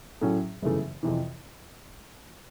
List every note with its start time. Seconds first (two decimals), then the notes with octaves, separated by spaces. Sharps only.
0.21 A2 F#3 A3 C#4
0.62 G1 F#2 C#3 E3 A3
1.03 F2 C3 E3